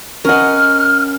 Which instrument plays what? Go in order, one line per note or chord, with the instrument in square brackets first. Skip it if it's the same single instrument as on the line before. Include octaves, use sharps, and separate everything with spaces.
[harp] C#4 F#5 [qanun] A#4 D#5 [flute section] F6